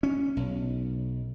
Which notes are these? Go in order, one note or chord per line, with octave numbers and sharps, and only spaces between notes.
C#4
B1